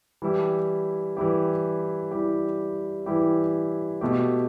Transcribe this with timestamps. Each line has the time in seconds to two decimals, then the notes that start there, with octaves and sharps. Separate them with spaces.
0.22 E3 G3 E4 G4
1.17 E3 G3 E4 G4
2.11 E3 G3 E4 G4
3.06 E3 G3 E4 G4
4.01 B2 A3 G4